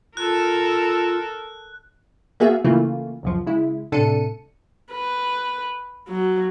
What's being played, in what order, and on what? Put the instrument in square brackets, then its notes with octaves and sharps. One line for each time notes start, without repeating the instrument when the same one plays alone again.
[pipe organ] F4 [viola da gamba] A4 A#4 [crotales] F#6
[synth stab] A#3 B3 F#4 G#4 E5
C#3 E3 A3 A#3 F4
C#2 F#2 F3
C#3 G#3 E4
A2 C3 D4 A4 C#7 D#7
[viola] B4
F#3